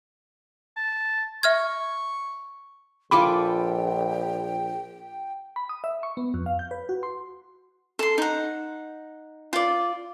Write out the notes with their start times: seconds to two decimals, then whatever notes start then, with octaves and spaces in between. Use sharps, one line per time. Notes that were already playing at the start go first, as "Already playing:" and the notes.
0.76 A5
1.43 E5 C#6 F6 G#6
3.11 A#1 F4 A4 G5 G#5 B5 D6
5.56 B5
5.69 D#6
5.84 E5
6.03 C#6
6.17 B3
6.34 F2
6.46 F5
6.59 G6
6.71 B4
6.89 F#4
7.03 C6
7.99 A4 C6
8.18 D#4 F#5
9.53 F4 D5